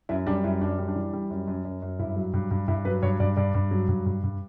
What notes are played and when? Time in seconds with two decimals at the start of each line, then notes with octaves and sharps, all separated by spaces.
0.09 F#2 E4
0.27 G3 D4
0.44 F#2 E4
0.61 F#2 D4
0.78 G3
0.88 D4
0.95 E3
1.13 G3
1.30 F#2
1.47 F#2
1.65 F#2
1.82 F#2
1.99 G2 E4
2.16 F#3
2.33 G2
2.51 G2
2.68 G2 E4
2.85 F#3 B4
3.02 G2 C#5
3.20 G2 D5
3.37 G2 D5
3.54 G2
3.71 F#3
3.88 G2
4.06 G2
4.23 G2